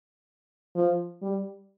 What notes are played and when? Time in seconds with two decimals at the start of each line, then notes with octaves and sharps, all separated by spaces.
0.75 F3
1.22 G3